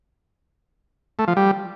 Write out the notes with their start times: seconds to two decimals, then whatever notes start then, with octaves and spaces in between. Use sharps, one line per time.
1.19 A3
1.28 F3
1.37 G3